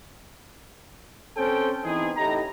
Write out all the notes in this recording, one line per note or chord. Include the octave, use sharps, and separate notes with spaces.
C4 C#4 A4 C5 G5
E3 B3 C4 D#4 G#4
A1 A2 D#4 G4 A#5